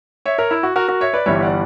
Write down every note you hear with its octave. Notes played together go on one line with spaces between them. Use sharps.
C#5 E5
A#4 C#5
E4
F#4
F#4 A#4
F#4 A#4
C#5 E5
B4 D5
G1 G2 E3 G3 C#5 E5
D5 F#5